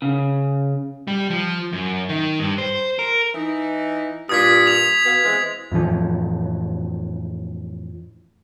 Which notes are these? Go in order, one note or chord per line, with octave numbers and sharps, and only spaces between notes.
C#3
G3
F3
F#2
D#3
G2
C5
A#4
E3 D#4
G2 A#2 D#6 G#6 B6
D#6 F7
B2 B3 F5
E3 G#3 C4
F2 A2 E3 F3